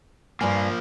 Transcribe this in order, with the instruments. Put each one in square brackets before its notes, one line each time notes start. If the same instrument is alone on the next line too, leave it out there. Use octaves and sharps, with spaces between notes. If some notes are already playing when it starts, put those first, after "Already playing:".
[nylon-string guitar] G2 G#5 [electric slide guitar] F3 A#3